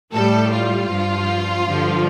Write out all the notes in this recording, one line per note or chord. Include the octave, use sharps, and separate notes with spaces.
A2 G3 A4
F4
G2 F3
G2 D3 F3